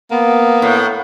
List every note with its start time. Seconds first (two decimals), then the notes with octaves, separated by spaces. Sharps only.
0.11 A#3 B3
0.62 A2